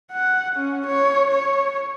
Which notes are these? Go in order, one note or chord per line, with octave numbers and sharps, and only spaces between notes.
F#5
C#4
C#5
C#5